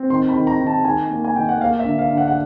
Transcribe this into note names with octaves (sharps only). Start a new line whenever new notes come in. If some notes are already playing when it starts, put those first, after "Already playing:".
Already playing: C4
D#3 C6
B5
D#3
A#5
D#3
A5
D#3 G#5
A#3
G#5
D#3 G5
F#5
A#3 F5
E5
D3
F5
D3
F#5
F#5